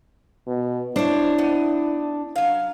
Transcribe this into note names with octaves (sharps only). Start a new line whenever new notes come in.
B2
D4 E4 C5 C#5
B3 D#4
F#3 F5